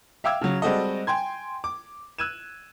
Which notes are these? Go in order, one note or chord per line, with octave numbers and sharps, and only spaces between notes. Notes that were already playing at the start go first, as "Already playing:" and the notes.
E5 F5 G5 D6 E6 G#6
C#3 F#3
G3 G#3 C4 F#4 A4 D#5
G5 G#5 C6 G#6
D6
E6 F#6 G#6 D#7 E7